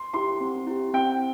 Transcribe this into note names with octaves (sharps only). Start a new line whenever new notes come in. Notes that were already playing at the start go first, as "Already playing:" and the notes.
Already playing: C6
E4 G4 C6
C4
E4 G4
C4 G5